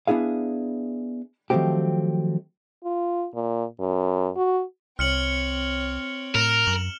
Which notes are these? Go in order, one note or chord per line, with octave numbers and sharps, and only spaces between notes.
B3 D4 E4 G#4 F5
D#3 F3 F#3 A3 C4 G4
F4
A#2
F#2
F#4
C2 C4 C#5 F6 C#7 F#7
A2 A#4 F6 E7
F#2 F#7